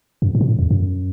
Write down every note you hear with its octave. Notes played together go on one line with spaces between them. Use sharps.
F#2
G#2
B2
A2
E2
F#2